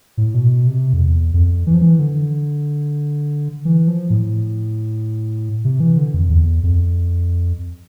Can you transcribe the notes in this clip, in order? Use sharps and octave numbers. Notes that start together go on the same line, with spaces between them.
A2
B2
C3
F2
E2
F2
E3
F3
E3
D3
E3
F3
A2
C3
E3
D3
F2
E2
F2